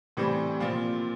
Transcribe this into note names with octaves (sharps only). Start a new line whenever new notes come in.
A2 E3 G3 C4
A#2 F3 C4 F4